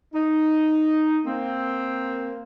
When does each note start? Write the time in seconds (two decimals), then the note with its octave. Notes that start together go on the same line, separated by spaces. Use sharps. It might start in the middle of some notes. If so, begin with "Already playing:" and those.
0.14 D#4
1.26 A#3 C4